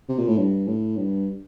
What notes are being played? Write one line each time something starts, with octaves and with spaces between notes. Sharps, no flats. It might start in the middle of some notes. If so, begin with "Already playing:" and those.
C3
A#2
A2
G2
A2
G2